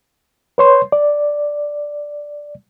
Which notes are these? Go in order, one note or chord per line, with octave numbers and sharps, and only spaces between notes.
B4 C#5 C6
D5